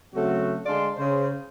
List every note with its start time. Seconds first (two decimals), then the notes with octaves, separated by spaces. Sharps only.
0.14 C#3 F#3 A3 C4 F#4
0.66 D3 G#3 D4 D5 F5 C6
0.97 C#3 C5